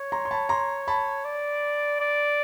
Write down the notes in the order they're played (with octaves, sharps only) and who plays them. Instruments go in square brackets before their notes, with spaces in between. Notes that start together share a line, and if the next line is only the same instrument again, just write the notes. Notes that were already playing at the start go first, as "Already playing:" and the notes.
Already playing: [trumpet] C#5
[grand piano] A#5 C6
C6
A5 B5
A#5 C6
A5 B5
[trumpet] D5
D5